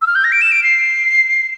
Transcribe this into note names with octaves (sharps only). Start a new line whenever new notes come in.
E6
F6
G6
A#6
D7
E7
D7
C7